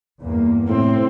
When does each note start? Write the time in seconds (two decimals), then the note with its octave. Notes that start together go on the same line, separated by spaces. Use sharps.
0.21 E2 G2 A#3
0.69 A2 C3 C4